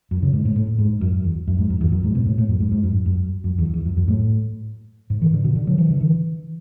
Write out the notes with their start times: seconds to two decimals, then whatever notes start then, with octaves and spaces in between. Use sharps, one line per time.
0.11 F#2
0.22 C#3
0.33 G#2
0.45 A2
0.56 A2
0.79 G#2
1.01 F#2
1.24 E2
1.48 F#2
1.59 G#2
1.70 F#2
1.81 E2
1.92 F#2
2.04 G#2
2.15 B2
2.26 A2
2.38 A2
2.49 F#2
2.60 G#2
2.72 G#2
2.83 F#2
3.06 F#2
3.44 F#2
3.58 E2
3.74 E2
3.86 F#2
3.97 F#2
4.08 A2
5.10 G#2
5.22 E3
5.33 D3
5.44 B2
5.56 D3
5.67 F#3
5.78 E3
5.90 D3
6.01 E3